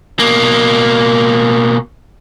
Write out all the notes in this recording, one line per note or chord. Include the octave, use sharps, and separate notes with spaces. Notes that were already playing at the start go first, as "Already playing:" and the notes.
B2 A#3